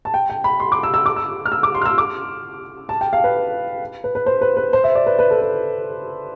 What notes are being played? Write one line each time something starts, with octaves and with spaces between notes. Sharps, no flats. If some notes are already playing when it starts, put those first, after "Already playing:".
A5
G5
G5
B5
C6
D6
E6
E6
D6
E6
F6
E6
D6
C6
F6
E6
D6
A5
G5
F5
B4
B4
B4
C5
B4
B4
C5
E5
D5
B4
B4
A4
B4